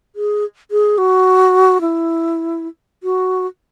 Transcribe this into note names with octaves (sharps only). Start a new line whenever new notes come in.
G#4
G#4
F#4
E4
F#4